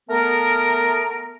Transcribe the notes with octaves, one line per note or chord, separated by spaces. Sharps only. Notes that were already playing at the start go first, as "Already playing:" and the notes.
A3 B3 A#4